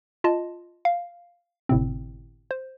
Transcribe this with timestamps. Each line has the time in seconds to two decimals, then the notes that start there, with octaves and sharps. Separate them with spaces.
0.24 F4 D#5 A5
0.85 F5
1.69 G1 A2 C3 C4
2.51 C5